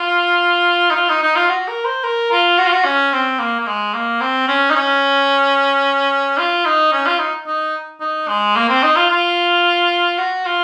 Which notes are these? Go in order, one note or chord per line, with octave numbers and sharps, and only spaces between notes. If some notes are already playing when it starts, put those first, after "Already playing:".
Already playing: F4
D#4
F4
D#4
D#4
F4
F#4
A#4
C5
A#4
F4
F#4
F4
F#4
C#4
C4
A#3
A#3
G#3
A#3
C4
C#4
D#4
C#4
F4
D#4
C#4
F4
D#4
D#4
D#4
G#3
A#3
C4
D#4
F4
F4
F#4
F4